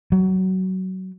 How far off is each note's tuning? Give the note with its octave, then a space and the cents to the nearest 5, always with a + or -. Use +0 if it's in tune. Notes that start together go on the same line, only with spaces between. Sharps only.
F#3 +20